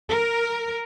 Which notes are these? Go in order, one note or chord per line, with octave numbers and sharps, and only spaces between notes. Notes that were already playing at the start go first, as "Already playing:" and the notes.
A#4